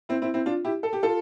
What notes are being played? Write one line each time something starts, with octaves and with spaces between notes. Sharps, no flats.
C4 E4
C4 E4
C4 E4
D4 F4
E4 G4
A4
G4
F4 A4